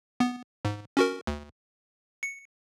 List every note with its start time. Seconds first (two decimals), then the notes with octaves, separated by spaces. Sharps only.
0.20 B3
0.65 G#2
0.97 C#4 F#4 A#4
1.27 D2
2.23 C#7